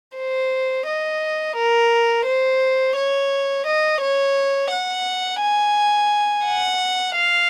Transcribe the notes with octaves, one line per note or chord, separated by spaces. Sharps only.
C5
D#5
A#4
C5
C#5
D#5
C#5
F#5
G#5
F#5
F5